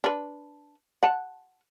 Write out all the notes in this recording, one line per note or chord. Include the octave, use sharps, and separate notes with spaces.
D4 B4
F#5 A5